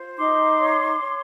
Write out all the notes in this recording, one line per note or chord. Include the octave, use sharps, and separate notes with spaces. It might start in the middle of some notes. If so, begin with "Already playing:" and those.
Already playing: F4 C5
D#4 C6 D6
C#5
C#5